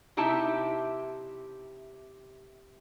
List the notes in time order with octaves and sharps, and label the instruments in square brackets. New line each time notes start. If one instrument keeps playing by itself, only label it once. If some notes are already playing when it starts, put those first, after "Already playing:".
[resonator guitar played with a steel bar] C3 D#4 E4 G4 E5 A5